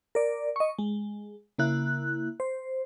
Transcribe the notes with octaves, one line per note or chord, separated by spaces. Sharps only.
A#4 D5
D#5 C#6
G#3
C#3 A#3 E4 F#6
C5